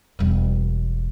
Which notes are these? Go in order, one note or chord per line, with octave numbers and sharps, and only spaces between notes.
E1 G3